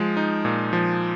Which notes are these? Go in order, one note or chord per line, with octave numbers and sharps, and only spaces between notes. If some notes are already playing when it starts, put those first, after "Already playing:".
Already playing: F3 G#3
D#4
A#2
F3